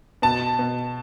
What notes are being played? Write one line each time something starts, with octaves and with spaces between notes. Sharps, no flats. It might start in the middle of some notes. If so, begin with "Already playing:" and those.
B2 A5
B2